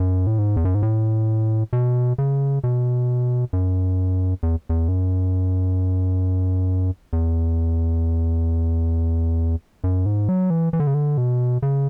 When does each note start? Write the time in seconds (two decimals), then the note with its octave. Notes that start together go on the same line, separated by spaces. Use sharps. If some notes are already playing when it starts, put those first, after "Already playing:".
Already playing: F#2
0.27 A2
0.39 G#2
0.57 E2
0.65 F#2
0.75 G#2
0.82 A2
1.73 B2
2.18 C#3
2.64 B2
3.53 F#2
4.43 E2
4.69 E2
4.88 F#2
7.13 E2
9.84 F#2
10.06 G#2
10.29 F#3
10.50 E3
10.73 E3
10.80 D3
10.87 C#3
10.94 D3
11.17 B2
11.62 C#3